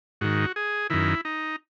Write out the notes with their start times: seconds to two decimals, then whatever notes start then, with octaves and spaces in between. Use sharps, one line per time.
0.21 G#2 D#3 F#4
0.56 G#4
0.90 F#2 D#3 E4
1.25 D#4